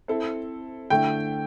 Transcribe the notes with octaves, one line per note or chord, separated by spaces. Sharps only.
C4 E4 A4
D3 A3 E4 G5